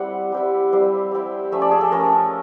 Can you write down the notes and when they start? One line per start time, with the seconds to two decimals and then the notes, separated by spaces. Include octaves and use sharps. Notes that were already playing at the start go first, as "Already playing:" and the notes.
Already playing: G3 C4 E4 F#5
0.32 G3 C4 E4
0.72 G3 C4 E4 F5
1.12 G3 C4 E4
1.52 F3 A3 C#4 E5
1.62 D5
1.71 G#4
1.81 A4
1.91 F3 A3 C#4 A#4